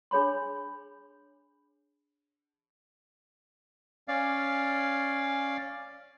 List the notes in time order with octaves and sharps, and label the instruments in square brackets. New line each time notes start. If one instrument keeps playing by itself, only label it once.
[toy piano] D4 G#4 C#5 B5 C6
[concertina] C#4 D5 F5